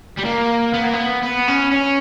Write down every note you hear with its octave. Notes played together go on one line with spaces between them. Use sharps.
G3
A#3
B3
A#3
B3
B3
C#4
C#4